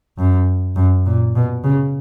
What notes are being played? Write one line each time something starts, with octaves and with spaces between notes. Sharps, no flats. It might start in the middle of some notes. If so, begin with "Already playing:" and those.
F#2
F#2
A#2
B2
C#3